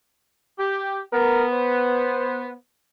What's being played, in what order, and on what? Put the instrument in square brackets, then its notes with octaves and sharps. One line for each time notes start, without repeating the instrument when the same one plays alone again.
[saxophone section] G4
[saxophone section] B3 [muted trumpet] A#4
[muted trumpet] C5